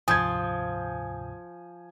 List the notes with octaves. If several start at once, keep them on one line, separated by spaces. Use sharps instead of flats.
D2 G#2 C3 F3 G#5 D#6 G6 G#6